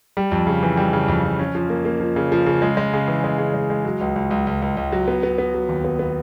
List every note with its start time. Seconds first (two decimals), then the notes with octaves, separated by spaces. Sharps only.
0.17 G3
0.32 F2
0.47 C#3
0.63 E3
0.77 G3
0.93 C#3
1.08 F2
1.24 F2
1.39 C#4
1.55 F3
1.70 A#3
1.85 A#3
2.00 F3
2.16 C#3
2.32 F3
2.46 C#3
2.62 G#3
2.77 G#3
2.93 C#3
3.08 E3
3.24 G#3
3.38 C#3
3.54 G#3
3.70 G#3
3.85 F#3
4.01 C#2
4.16 C#2
4.31 C#2
4.47 C#2
4.62 C#2
4.77 C#2
4.92 F#3
5.08 B3
5.23 B3
5.38 B3
5.54 F#3
5.69 D#2
5.84 B3
5.99 B3